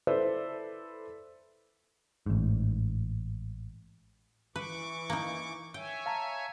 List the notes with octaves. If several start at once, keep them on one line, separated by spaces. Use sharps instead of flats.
E4 A4 B4 C5 D5 E5
A1 G#2
E3 B4 C#6 D6
A#3 D#4
C#5 E5 G5 G#5
F5 A5 A#5